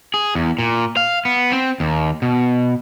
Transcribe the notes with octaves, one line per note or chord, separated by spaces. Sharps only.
G#4
E2
A#2
F5
B3
C4
D#2
B2